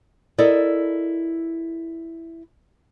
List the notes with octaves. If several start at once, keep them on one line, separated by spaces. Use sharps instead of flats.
E4 A4 A#4 D5 D#5